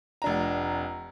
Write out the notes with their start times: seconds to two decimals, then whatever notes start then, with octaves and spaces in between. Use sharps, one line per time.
0.22 F1 D4 A#5